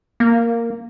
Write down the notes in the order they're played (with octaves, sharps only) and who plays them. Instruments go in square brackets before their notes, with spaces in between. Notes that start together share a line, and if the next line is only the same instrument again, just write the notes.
[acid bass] A#3